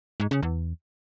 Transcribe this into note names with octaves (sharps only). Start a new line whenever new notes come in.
G#2
C#3
E2